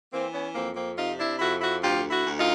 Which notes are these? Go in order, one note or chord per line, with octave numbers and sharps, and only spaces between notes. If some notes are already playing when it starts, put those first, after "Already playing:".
E3 A#3 C4
B3 C#4
F2 A#3 C4
A#3 C4
C3 D#4 F4
D4 E4
F2 E4 F#4
E4 F#4
D2 F4 G4
E4 F#4
D2
D#4 F4